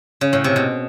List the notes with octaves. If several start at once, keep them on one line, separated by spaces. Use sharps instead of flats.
C#3
A2
C3
B2